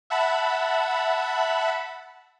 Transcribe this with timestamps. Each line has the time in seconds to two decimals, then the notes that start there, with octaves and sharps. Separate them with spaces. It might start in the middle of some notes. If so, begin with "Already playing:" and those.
0.10 E5 F#5 A5 B5